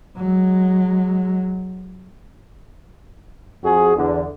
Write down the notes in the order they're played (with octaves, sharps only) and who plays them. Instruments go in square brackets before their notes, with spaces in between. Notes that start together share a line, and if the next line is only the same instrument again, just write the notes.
[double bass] F#3 G#3
[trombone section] F2 F#4 G#4
E2 D3